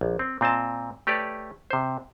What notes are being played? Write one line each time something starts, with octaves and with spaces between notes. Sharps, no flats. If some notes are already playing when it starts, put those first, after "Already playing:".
A#1
C4
A#2 C4 D#5 A5
A3 G4 B4 C#5 D5
C3 C5